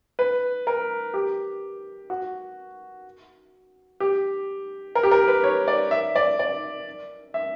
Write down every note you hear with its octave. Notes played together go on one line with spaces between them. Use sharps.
B4
A#4
G4
F#4
G4
A#4
G4
A#4
B4
C#5
D5
E5
D5
D5
E5